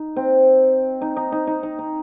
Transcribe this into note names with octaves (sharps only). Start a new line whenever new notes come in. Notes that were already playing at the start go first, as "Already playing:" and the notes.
Already playing: D#4
C4
D#4
D#4
D#4
D#4
D#4
D#4